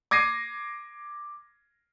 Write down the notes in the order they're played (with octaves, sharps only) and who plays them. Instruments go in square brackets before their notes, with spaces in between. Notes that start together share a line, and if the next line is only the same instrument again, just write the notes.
[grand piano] D6 G#6 A#6 C7 D#7